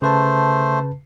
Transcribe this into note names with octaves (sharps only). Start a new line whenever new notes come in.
C#3 A3 B4 C5 A5